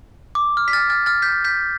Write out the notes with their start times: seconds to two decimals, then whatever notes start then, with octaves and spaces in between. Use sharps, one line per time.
0.35 D6
0.57 F6
0.68 B6
0.73 F6 A6
0.90 F6 A6
1.06 F6 A6
1.22 G6 B6
1.44 G6 B6